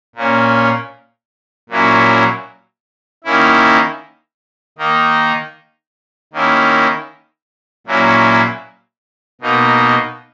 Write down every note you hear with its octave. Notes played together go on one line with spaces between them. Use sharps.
A#2 A#3 C#4
A#2 F#3 A#3 C#4 E4
D#3 A#3 C#4 E4
D#3 A#3 D#4
D#3 A#3 C#4 E4
A#2 F#3 A#3 C#4 E4
B2 A#3 D#4